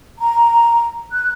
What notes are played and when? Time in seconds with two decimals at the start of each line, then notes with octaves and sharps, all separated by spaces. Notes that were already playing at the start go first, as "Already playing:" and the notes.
0.19 A#5
1.12 F#6